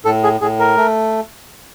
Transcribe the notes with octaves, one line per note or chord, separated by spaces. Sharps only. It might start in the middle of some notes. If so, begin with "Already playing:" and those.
A2 A4
G#4
A2 G#4
A#4
A3